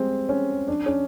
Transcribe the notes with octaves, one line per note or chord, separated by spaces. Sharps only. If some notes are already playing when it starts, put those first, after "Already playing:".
Already playing: G3 G#3 C4
C#4
D4
C#4